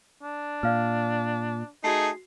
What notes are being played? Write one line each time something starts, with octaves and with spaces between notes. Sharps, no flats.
D4
A#2 D5 F5 F6
A3 D#4 F#4 G#4 C7